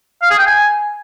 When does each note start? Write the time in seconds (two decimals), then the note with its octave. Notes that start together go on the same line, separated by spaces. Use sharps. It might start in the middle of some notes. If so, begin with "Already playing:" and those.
0.22 F5
0.30 G#4
0.38 G5
0.47 G#5